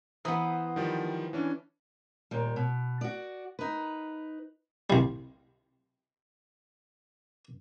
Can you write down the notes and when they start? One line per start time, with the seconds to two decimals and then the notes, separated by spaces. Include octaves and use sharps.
0.25 E3 B3 C5 A#5 D#6
0.76 D#3 F3 G3
1.33 E3 C#4 D4
2.31 D#2 A#2 G3
2.56 B2
3.01 F#4 D5
3.59 D#4 B4
4.90 C2 G3